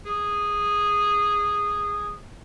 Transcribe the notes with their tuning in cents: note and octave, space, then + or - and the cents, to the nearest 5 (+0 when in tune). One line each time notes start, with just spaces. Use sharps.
G#4 -10